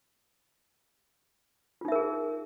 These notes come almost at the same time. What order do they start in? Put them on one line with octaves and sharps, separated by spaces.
F4 D#4 E5 A#4 G#4